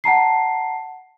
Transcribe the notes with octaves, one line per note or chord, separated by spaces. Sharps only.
F#5 A5 A#5 C7